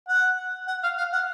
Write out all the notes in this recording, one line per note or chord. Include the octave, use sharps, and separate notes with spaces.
F#5
F#5
F5
F5
F#5